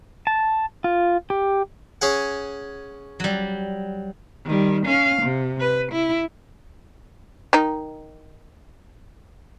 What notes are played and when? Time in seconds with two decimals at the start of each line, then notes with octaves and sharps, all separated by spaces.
0.27 A5
0.84 F4
1.30 G4
2.02 C#4 G#4 F#5
3.20 F#3 G3
4.45 D#3 G3
4.86 C#4 F5
5.22 C3
5.60 B4
5.92 E4
7.53 D#3 D#4